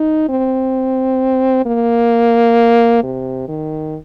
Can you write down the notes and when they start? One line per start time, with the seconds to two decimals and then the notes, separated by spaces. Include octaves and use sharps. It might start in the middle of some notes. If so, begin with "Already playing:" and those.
Already playing: D#4
0.29 C4
1.66 A#3
3.03 C3
3.48 D#3